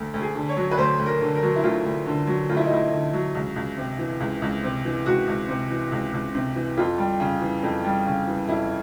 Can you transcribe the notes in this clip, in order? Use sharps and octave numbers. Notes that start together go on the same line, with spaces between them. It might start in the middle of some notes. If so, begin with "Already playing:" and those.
Already playing: D2
D2
G#4
D3
C#5
F#3
B4
D2 C5
D2
A#4
D3
A#4
F#3
E4
D2 F4
D2
D3
F#3
D2 F4
E4
D#4
D2 E4
D3
F#3
C#2
C#2
C3
E3
C#2
C#2
C3
E3
C#2 F#4
C#2
C3
E3
C#2
C#2
C3
E3
F2 F4
G3
C#3
E3
F2
G3
C#3
E3
F2 E4